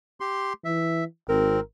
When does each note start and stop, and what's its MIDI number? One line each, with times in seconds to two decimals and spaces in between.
0.20 0.53 67
0.20 0.53 84
0.65 1.04 52
0.65 1.04 76
1.29 1.58 32
1.29 1.60 60
1.29 1.59 70